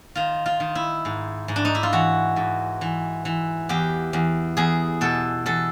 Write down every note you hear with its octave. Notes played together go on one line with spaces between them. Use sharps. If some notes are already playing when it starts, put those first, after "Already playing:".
D#3 F4
F4
D#3
E4
G#2
G#2
D4
D#4
E4
F4
E3 F#4
G#2
E3
E3
E2 G4
E2
E2 G#4
B2 A4
E2 A4